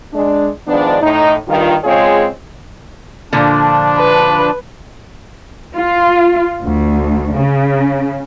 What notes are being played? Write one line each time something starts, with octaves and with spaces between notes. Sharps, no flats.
G#3 D4
D#3 F3 G#3 B3 D4
A2 D#4
G2 D#3 F4
C#3 G#3 C4 F4 G#4 C#5
A#2 D3 F3 D4
B4
F4
D2
C#3